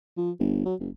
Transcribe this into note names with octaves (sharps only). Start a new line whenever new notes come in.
F3
G1
F#3
F#1